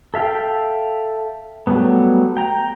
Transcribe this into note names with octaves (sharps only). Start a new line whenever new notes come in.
A4 E5 F5 G5
F#3 G3 A3 B3
G5 A#5